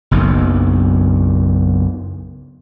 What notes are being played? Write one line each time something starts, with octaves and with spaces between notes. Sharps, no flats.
F#1 B1 F#2